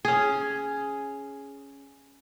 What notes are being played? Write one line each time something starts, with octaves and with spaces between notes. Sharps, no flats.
C#4 G#4